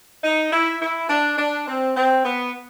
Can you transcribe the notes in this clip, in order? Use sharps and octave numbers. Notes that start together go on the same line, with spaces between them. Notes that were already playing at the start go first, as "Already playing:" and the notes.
D#4
E4
E4
D4
D4
C4
C4
B3